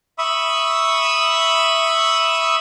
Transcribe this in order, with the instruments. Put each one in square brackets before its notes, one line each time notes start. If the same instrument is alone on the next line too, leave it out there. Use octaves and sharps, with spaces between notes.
[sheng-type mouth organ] E5 B5 C#6 D#6 E6